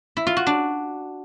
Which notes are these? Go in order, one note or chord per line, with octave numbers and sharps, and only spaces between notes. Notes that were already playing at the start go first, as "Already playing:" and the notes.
E4
F4
F#4
D4